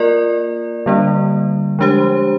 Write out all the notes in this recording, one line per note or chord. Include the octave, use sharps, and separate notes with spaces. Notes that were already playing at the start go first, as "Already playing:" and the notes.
Already playing: A#3 F4 A#4 D5
D3 G3 A#3 D4
F3 G#3 D4 G4 C5